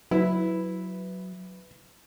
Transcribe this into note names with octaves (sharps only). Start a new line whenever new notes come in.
F#3 E4 B4